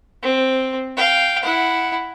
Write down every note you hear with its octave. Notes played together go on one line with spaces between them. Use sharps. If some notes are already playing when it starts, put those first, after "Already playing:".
C4
F5 G5
E4 F#5